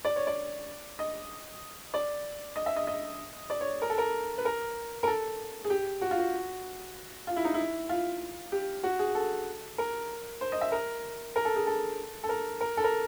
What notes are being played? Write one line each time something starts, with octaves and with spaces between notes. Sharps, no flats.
D5
C#5
D5
D#5
D5
D#5
E5
D#5
D#5
D5
C#5
A#4
A4
A#4
B4
A#4
A#4
A4
G#4
G4
F#4
F4
F#4
F4
E4
D#4
E4
F4
G4
F#4
G#4
A4
A#4
C5
D#5
E5
A#4
A#4
A4
G#4
A4
A4
A#4
A#4
A4
A#4